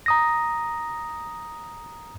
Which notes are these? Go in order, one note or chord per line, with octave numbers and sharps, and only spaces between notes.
A#5 D#6 A#6